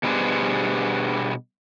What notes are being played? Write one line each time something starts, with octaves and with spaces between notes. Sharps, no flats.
B2 G3 B3 D4 G#4 C5